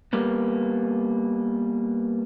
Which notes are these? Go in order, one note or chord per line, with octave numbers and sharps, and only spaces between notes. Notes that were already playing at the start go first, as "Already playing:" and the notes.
G3 A#3 B3